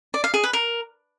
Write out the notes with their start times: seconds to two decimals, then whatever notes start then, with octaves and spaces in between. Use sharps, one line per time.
0.14 D5
0.24 F5
0.34 G#4
0.44 B4
0.53 A#4